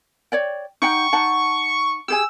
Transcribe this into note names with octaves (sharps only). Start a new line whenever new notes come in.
C#5 D5 G5
D#4 F#5 G5 C#6
D#4 F#5 A5
G4 G#4 G#5 E6